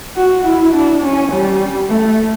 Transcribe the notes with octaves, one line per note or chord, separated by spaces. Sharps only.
F#4
E4
D4
C#4
G3
A3